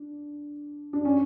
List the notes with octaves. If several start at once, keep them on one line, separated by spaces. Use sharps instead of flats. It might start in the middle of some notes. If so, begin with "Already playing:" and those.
Already playing: D4
D4
C#4